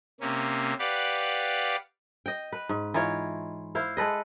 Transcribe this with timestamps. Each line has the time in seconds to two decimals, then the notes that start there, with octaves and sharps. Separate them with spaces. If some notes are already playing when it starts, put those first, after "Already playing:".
0.21 C3 A#3 C#4
0.79 G4 B4 D5 F5 F#5
2.26 D#5 G5
2.52 B4
2.69 G#2
2.94 E3 D#4 F4 C#5
3.75 E4 C5 F5
3.97 G#3 A4 B4 D#5